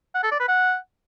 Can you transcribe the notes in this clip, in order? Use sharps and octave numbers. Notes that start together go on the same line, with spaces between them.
F#5
A4
D5
B4
F#5